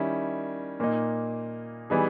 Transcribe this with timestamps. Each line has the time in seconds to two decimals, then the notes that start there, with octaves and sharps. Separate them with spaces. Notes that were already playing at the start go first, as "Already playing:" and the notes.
Already playing: D#3 G3 C#4 E4
0.80 A#2 A#3 D#4
1.90 E3 G3 B3 D#4 G#4